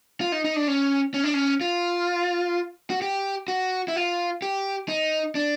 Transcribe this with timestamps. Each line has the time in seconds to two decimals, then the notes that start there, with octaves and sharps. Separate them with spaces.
0.21 F4
0.32 D#4
0.44 D#4
0.56 D4
0.68 C#4
1.14 C#4
1.24 D4
1.34 C#4
1.61 F4
2.90 F#4
3.02 G4
3.48 F#4
3.88 E4
3.96 F4
4.42 G4
4.88 D#4
5.35 D4